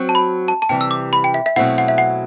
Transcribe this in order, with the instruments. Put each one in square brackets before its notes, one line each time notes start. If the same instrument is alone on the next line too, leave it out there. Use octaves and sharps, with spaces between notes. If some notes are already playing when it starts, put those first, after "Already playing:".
Already playing: [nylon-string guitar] F#3 C4 F#4
[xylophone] A5
B5
A5
A5
[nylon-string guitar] C3 E3 G3 [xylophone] G5
[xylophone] E6
D6
B5
G5
E5
E5
[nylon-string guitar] B2 F#3 A3 C4 E4 [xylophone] F#5
[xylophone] F#5
E5
F#5